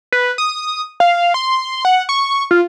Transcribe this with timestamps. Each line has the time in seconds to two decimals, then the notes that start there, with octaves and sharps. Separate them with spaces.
0.12 B4
0.38 D#6
1.00 F5
1.34 C6
1.85 F#5
2.09 C#6
2.51 F4